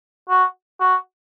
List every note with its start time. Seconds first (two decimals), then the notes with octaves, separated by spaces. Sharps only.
0.29 F#4
0.80 F#4